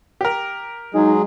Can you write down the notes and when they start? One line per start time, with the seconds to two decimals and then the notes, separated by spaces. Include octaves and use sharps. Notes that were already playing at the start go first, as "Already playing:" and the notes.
0.21 G4 A#4
0.94 F#3 G#3 D#4 G#4